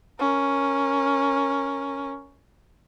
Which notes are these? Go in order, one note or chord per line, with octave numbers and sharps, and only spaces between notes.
C#4 A#4